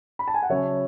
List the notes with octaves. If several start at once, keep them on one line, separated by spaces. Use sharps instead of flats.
B5
A5
G#5
F#5
C#3 F#3 C#5 E5